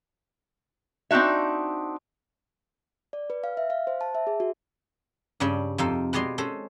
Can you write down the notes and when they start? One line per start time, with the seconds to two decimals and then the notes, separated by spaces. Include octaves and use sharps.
1.11 C4 D4 D#4 F#4 E5
3.13 D5
3.30 B4
3.44 F5
3.57 E5
3.70 F5
3.87 C5
4.01 A5
4.15 E5
4.27 G#4
4.40 F#4
5.40 G2 C#3 C#4 D4 G5
5.78 F2 C3 D#4 A4 F5 G5
6.13 B2 G#3 G4 D5 D#5 C6
6.38 G#3 C#4 A4 C5